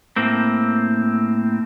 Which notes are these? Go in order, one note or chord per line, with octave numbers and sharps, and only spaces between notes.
A2 A#3 C4